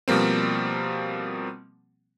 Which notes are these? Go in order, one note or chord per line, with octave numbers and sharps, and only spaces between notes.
B2 F3 G3 A#3 C4